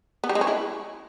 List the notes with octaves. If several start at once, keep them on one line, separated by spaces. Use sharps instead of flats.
B3
G3
G#3
C#4
E4